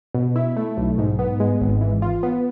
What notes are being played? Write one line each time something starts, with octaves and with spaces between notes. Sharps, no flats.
B2
E4
A3
B1
G#2
B3
G#3
G#1
E3
F4
B3